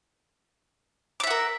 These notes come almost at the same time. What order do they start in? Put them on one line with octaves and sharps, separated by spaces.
D6 E5 F#5 A#4